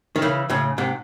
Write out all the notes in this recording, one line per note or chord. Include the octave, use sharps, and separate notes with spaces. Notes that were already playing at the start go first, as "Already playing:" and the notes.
D#3
C#3 E3
A2 C#3
G#2 C3